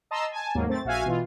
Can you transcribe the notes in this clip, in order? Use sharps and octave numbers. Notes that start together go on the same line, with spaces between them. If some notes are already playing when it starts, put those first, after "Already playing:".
D#5 A5 A#5 C6 E6
G#5 A5
D#2 G#2 F#3 A#3
A3 C4 A6
A#1 F#4 E5 F5 G#5
B2 E3 F4